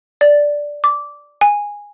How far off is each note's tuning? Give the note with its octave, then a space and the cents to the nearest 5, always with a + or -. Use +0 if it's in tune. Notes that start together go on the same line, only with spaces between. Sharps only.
D5 -5
D6 -15
G#5 -10